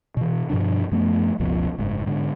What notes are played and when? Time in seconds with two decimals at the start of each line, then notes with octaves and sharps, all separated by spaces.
0.17 B2 E3
0.50 G2 B2 F3 D4
0.92 F#2 F3 A3 B3
1.39 F#1 C#2 B2 F3
1.78 F#1 G#2
2.06 G#2 D3